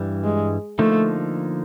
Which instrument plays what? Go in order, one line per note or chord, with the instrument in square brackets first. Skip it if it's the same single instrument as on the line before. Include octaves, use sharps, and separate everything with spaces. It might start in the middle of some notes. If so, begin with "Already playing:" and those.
Already playing: [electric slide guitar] G2 E3 G3
[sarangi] G#3
[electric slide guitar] D3 F3 A#3 D#4 [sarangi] A3